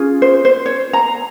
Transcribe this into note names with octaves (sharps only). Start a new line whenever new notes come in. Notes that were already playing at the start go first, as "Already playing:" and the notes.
Already playing: C#4 F4 G#4
C5
C5
C#5
A#5